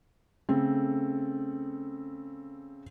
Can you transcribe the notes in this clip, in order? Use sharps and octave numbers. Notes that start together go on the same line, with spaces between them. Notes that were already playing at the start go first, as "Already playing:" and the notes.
C#3 A3 C4 A4